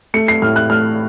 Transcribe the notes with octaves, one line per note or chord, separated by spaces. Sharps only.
A3 C#7
C7
A2 F6
F#6
A3 F6